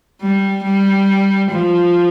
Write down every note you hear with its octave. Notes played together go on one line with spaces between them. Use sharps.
G3
G3
F3